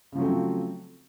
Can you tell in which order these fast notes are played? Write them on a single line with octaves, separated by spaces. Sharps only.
C#3 F3 F#3 A3 C4